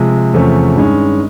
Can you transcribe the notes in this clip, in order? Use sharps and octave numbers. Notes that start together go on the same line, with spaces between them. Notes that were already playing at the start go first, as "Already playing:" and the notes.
Already playing: C3 F3 G#3
E2 C3 F3 A3 C#4
G2 D#3 G#3 C#4